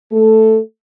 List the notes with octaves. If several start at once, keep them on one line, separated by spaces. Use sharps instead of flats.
A3 A4